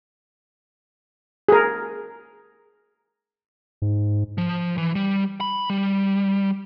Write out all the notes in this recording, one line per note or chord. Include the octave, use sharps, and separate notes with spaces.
G#4 A#4
G#2
F3
E3
G3
B5
G3